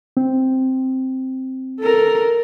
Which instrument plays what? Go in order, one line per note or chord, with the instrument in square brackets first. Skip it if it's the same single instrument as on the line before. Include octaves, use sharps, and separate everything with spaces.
[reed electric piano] C4
[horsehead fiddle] A4 A#4